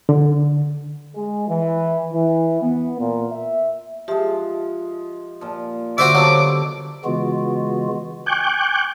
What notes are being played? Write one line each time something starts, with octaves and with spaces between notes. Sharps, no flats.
D3
G#3
E3
E3
B3
A#2
E5
F3 G#3 G4 E5
A#2 F3
G2 D3 F#4 C5 E5 D6
B2 F3 F#3 A4
C#3 E3 G#3 B3 F4 F#4
G5 G#5 C#6 D6 F#6 G6